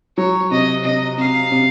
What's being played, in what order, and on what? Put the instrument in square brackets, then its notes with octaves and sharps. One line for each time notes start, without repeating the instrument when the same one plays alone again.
[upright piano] F#3 [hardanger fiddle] C#5
[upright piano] C3 [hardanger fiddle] D#5
[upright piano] C3 [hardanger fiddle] D#5
[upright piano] C3 [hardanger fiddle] F5
[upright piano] C3